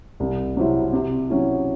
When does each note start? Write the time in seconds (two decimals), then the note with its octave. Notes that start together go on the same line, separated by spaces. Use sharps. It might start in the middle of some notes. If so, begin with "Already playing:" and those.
0.20 C2
0.56 C3 F#3 C4 E4
0.93 C3
1.30 F#3 C#4 E4